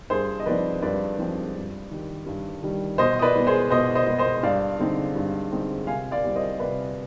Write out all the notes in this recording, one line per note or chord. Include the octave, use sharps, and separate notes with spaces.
G2 G#4 C5
D#5
F3 G#3 C4 D#4 B4 D5
G2 B4 D5
F3 G#3 C4 D#4
G2
D#3 G3
G2
D#3 G3
B2 C5 D#5
D#5
B4 D5
G#3 B3
G#4 C5
B2 C5 D#5
C5 D#5
G#3 B3
C5 D#5
G2 D5 F5
D3 G#3 C4 D#4
G2
D3 G#3 C4 D#4
C3 F5 G#5
D5 F5
G3 C4
C5 D#5
C3 B4 D5